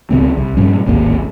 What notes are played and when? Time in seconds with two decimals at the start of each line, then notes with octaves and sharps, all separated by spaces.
0.11 C#2 C#3 B3 C4
0.37 C2
0.57 G2 A#2 G3 C#4
0.86 D1 G#1 D#2 A#3